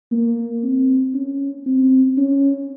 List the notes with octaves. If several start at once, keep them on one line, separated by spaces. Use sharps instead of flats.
A#3
C4
C#4
C4
C#4